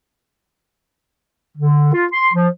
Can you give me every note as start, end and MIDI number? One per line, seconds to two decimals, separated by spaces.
1.57 1.92 50
1.94 2.05 65
2.12 2.28 84
2.33 2.47 53